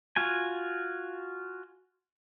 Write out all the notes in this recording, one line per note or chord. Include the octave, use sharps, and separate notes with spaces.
F4 F#4 G#5